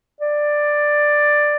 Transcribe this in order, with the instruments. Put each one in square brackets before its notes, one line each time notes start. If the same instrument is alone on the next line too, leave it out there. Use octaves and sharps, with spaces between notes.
[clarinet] D5